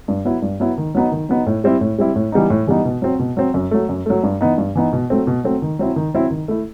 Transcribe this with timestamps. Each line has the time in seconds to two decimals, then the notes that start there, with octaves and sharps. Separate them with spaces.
0.08 G2
0.25 F#3 B3 E4
0.42 G2
0.60 F#3 B3 E4
0.78 D#3
0.95 F#3 B3 D#4
1.12 D#3
1.29 F#3 B3 D#4
1.46 A2
1.64 G3 C4 E4
1.81 A2
1.98 G3 C4 E4
2.16 A2
2.32 E3 G3 B3 D#4
2.50 A2
2.67 E3 G3 B3 D#4
2.85 B2
3.02 F#3 C4
3.19 B2
3.37 F#3 C4
3.54 F#2
3.71 F#3 A3
3.89 F#2
4.06 F#3 A3
4.23 G2
4.41 E3 B3 D#4
4.58 G2
4.75 E3 B3 D#4
4.93 B2
5.10 F#3 A3 C4
5.27 B2
5.44 F#3 A3 C4
5.62 D#3
5.79 F#3 C4 E4
5.96 D#3
6.14 F#3 C4 E4
6.31 D#3
6.48 A3 E4